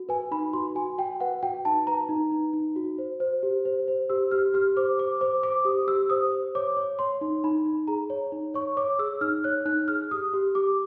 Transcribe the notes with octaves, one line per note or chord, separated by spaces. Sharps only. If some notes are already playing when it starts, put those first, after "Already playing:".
Already playing: F#4
B4 G#5
D#4 B5
F#4 C6
F#4 G#5
F#4 G5
B4 F#5
F#4 G5
D#4 A5
B4 A#5
D#4
D#4
D#4
F#4
C5
C5
G4
C5
C5
G4 E6
G4 F6
G4 F6
C5 D6
C5 D6
C5 D6
C5 D6
G4 D#6
G4 E6
C5 D#6
C5
C#5 D6
C#5
C#5 C6
D#4
D#4 B5
D#4
G#4 A#5
C#5
D#4
C#5 C#6
C#5 D6
G#4 E6
D#4 F6
C#5 F#6
D#4 F#6
G#4 F6
G4 D#6
G4
G4 D6